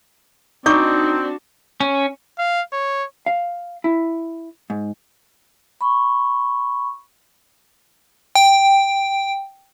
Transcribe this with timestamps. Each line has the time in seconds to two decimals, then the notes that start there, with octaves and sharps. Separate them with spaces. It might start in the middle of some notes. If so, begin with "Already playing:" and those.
0.66 C4 D4 D#4 F#4 D5 C#6 D6
1.80 C#4
2.38 F5
2.73 C#5
3.26 F5
3.84 E4
4.70 G#2
5.81 B5 C#6
8.35 G5